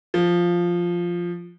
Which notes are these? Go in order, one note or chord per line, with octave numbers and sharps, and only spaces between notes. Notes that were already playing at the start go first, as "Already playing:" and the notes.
F3